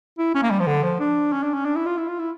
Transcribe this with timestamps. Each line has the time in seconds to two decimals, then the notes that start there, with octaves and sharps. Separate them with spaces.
0.18 E4
0.35 C#4
0.43 A#3
0.51 G3
0.60 F3
0.67 D3
0.83 F3
1.00 D4
1.32 C#4
1.43 D4
1.54 C#4
1.65 D4
1.76 E4
1.86 F4
1.97 E4
2.08 F4
2.19 E4